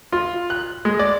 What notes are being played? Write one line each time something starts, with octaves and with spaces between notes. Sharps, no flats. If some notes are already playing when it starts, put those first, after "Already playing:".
F4
F#6
G#3
D5